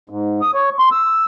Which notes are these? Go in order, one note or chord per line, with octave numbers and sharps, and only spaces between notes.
G#2
D#6
C#5
C6
E6